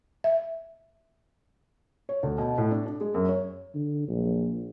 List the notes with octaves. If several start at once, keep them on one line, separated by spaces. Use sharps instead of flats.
E5
C#5
D2
B2
A2
D4
D4
G#3
F#2
C#5
D3
A#1